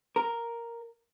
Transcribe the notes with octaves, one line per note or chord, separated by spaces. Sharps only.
A#4